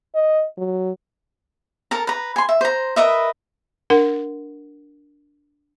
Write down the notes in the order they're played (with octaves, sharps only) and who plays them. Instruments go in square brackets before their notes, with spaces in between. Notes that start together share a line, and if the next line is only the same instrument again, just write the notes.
[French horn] D#5
F#3
[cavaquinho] A4 A#4 A5 A#5
B4 A#5
G#5 C6
E5
C5 A#5
A#4 B4 D#5 E5
[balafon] D4 A#4 F#5